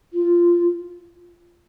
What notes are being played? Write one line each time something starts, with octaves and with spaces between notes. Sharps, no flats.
F4